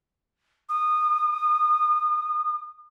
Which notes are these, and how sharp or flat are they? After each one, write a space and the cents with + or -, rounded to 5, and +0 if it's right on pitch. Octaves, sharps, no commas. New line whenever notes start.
D#6 -20